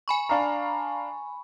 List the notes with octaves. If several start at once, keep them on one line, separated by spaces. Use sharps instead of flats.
G#5 B5 C#6
D4 F5 A#5